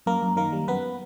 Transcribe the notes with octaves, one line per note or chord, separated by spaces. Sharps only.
F#2 A#3 A#4
F#2
D#3 A#3 A#4
G3
F#2 B3 B4